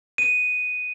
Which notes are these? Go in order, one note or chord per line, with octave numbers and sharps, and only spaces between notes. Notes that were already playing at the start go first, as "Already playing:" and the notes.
D#7